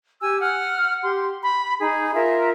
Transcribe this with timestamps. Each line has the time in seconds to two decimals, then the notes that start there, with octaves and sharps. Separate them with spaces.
0.21 G4 G#5 E6
0.41 F#5 F6
1.03 G4 C6
1.43 B5
1.81 D#4 G#4
2.14 F4 A#4 E5